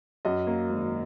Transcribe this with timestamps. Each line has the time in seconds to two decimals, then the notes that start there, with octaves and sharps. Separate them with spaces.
0.25 F#2 D#5
0.47 A#3
0.70 G#1